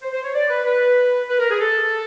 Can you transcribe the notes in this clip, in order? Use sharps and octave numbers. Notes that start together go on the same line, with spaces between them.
C5
C5
C#5
D5
B4
B4
B4
A#4
G#4
A4